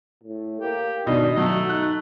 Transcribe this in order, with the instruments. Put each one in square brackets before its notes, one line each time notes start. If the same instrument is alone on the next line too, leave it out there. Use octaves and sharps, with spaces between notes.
[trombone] A2
[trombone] A#3 [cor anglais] G4
[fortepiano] B2 D#4 [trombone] D4 [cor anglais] D#5
[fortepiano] F#3 [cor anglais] A3 [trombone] F#4
[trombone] D#4 [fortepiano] F#6